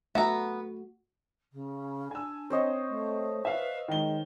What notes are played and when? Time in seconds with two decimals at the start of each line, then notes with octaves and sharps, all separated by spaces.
0.15 A3 B3 F#4 E5 A#5
1.52 C#3
2.11 D4 G#5 E6
2.50 C4 C5 C#5 D#5
2.88 A3
3.45 B4 E5 F5
3.88 D#3 G#3 G7